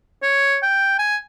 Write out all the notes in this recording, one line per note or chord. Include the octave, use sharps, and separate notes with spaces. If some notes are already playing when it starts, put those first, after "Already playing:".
C#5
G5
G#5